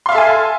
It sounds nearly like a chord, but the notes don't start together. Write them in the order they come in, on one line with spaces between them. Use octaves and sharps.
C6 F5 E5 A4 G#5